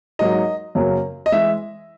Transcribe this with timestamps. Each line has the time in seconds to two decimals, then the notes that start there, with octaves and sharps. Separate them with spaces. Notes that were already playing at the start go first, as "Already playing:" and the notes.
0.19 G#2 F#3 A#3 D#4 D#5
0.75 F#2 C#3 F#3 A#3
1.26 D#5
1.32 E3 G#3 E5